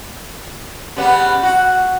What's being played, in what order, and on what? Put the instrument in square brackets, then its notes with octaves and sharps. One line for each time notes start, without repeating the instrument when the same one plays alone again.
[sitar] C#3 G3 B3
F#4